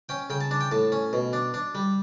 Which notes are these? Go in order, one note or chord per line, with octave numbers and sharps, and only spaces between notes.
C#4 G5
C#3 G5
A5
D4 A5
G5
A2 A5
C#4
B2
D4
D4
G3